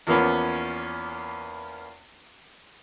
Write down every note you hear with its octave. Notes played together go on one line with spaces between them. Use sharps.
E2 F3 A#3 B3 C#4